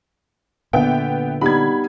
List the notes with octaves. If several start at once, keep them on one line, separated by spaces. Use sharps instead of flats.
A#2 D3 B3 E5 G5
G3 B3 D#4 B5 G#6